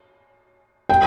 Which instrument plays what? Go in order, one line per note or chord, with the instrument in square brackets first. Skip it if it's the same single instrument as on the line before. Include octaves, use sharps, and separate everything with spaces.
[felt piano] G5